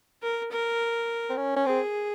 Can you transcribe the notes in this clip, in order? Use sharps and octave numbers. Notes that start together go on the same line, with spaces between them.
A#4
A#4
C4
C#4
C#4
C4 G#4